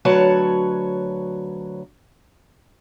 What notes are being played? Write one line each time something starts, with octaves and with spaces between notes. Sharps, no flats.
D2 F#3 B4 C#5 A5